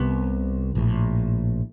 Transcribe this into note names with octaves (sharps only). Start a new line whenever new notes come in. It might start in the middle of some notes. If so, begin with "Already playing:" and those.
Already playing: C2 C3 B3
A#1 A2